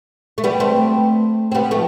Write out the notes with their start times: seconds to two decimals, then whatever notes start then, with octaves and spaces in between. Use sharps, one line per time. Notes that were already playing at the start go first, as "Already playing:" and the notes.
0.38 A3
0.44 G3 B3
0.60 A3 C4
1.52 C4
1.54 G3 B3
1.71 F3 A3